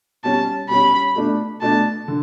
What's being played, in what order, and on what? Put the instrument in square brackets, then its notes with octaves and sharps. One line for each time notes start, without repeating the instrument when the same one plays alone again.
[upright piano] B2 G3 C#4 [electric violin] A5
[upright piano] B2 G3 C#4 [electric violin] B5
[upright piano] B2 A3 D4
[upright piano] B2 A3 D4 [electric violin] A5
[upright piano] D3